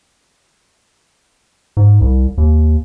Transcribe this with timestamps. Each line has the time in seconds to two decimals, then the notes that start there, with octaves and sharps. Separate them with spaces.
1.77 G#2
2.01 C2
2.38 D#2